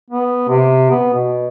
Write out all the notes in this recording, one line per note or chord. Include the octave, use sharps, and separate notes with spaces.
B3
C3
B3
B2